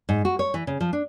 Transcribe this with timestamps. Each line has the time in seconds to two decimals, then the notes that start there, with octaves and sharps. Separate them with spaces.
0.09 G#2
0.25 F#4
0.39 C#5
0.54 E3
0.67 C#3
0.81 F3
0.93 D4